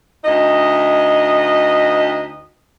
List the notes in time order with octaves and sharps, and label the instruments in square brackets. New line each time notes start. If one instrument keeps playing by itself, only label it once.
[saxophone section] D2 D#4 D#5